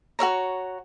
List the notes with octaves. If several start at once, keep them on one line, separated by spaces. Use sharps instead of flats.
F#4 A#4 C#5 A#5